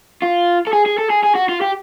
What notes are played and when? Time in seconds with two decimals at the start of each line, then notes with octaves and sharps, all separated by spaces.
0.23 F4
0.67 A4
0.73 G#4
0.86 G#4
0.98 A4
1.10 G#4
1.23 G#4
1.35 F#4
1.49 F4
1.61 G4